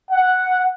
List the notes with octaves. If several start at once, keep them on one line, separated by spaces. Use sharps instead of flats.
F#5